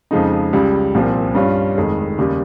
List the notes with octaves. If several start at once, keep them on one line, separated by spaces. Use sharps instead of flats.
F2 C#3 F3 G#3 D#4
C#2 C#3 G3
C2 A#2 F3 C4
G2 G3 C#4 F4
F1 F2 D#3 G#3
D#2 C#3 G3